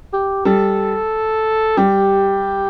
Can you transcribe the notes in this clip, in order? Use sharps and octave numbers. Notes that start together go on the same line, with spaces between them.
G4
G3 A4
G3 G4